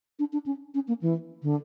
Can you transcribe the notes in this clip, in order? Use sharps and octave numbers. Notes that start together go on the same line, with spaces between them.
D4
D4
C#4
C#4
A#3
E3
D3